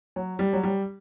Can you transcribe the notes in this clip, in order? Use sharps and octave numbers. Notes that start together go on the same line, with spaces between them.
F#3
G3
F#3
G3